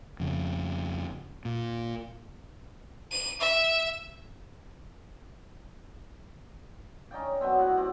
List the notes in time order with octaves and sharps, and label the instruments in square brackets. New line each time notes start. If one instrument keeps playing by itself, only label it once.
[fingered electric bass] F2 C#3
A#2
[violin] D#7
E5
[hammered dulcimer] C#4 D#4 D5 G5
B2 F#3 B3 C4
A2 F#4 D#5 F#5
C4 G4